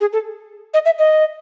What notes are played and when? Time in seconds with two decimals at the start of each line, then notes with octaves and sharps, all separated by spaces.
0.01 G#4
0.13 A4
0.74 D#5
0.85 E5
0.99 D#5